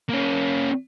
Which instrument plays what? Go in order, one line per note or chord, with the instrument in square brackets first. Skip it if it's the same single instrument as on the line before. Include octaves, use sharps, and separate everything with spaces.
[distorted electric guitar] A#3 C#4